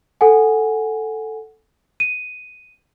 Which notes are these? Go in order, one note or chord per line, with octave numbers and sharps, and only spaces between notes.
A4 F#5 G#5
D#7